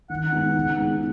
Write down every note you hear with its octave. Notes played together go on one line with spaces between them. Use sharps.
D#3 F#5
G#3 B3 D#4
C#3
G#3 B3 D#4 G#4